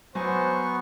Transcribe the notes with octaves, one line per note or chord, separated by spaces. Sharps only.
F#3 B3 C5 G#5 C#6